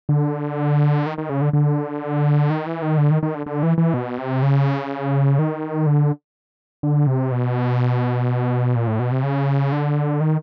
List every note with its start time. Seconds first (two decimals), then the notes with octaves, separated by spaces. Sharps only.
0.09 D3
1.06 D#3
1.18 D#3
1.30 C#3
1.41 D3
1.53 D3
2.50 D#3
2.67 E3
2.82 D#3
2.98 D3
3.11 D#3
3.23 D#3
3.35 D3
3.46 D3
3.63 E3
3.78 E3
3.94 B2
4.18 C3
4.43 C#3
5.39 D#3
5.87 D3
6.83 D3
7.07 C3
7.32 B2
8.76 A#2
8.87 A2
8.99 B2
9.12 C3
9.23 C#3
9.72 D3
10.21 D#3